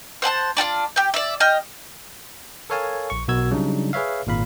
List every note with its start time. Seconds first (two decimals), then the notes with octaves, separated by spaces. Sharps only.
0.22 C5 F#5 G#5 A5
0.57 D4 F4 G4 D5
0.96 G4 G5
1.14 D5 E5
1.40 D#5 G5 F6
2.70 A4 A#4 C#5 F5 G#5 A5
3.10 A#1 C#6
3.28 B1 B2 F#4 A#4 E6 G#6
3.51 C#3 F#3 G3 D4 D#4
3.93 G#4 B4 C#5 E5 F5
4.27 G#1 A#2 F5 B5